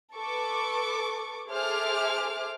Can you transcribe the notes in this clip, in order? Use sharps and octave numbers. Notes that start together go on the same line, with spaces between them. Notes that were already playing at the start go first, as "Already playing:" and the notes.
A4 B4 C#6 D6
G#4 A4 C5 E5 D6 F6